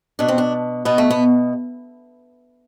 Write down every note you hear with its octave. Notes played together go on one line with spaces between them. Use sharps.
B2 D4
C4
D4
B2 B3
A3
B3